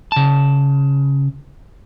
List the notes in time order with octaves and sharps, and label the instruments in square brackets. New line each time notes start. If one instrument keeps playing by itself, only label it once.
[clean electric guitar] C#3 A5